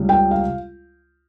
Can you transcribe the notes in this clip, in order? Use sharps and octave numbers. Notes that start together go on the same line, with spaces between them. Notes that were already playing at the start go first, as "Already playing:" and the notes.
Already playing: C#2 C#3 G3
G5
F5